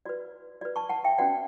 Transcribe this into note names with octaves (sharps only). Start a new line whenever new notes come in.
F#4 B4 D5
F#4 B4 D5
A5 C#6
F#5 A5
E5 G5
C#4 F#4 B4 D5 F#5